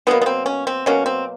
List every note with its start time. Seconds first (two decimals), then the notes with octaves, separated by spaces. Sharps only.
0.07 B2 F#3 A#3 B3
0.21 B3
0.26 C4
0.46 C#4
0.67 C4
0.86 B2 F#3 A#3 C#4
1.06 C4